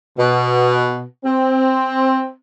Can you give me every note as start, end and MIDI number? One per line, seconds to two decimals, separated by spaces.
0.18 1.01 47
1.24 2.28 60